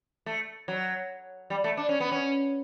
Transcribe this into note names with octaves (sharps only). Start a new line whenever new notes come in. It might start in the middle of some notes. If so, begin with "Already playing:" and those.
A3
F#3
G3
A3
D4
C#4
B3
C#4